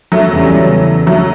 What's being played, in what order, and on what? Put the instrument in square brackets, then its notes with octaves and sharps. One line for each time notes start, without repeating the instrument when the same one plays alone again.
[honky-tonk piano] F#3 A3
[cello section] E2 C#3 G3
[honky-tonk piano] F#3 A3